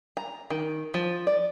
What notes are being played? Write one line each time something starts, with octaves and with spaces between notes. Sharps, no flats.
A#5
D#3
F3
D5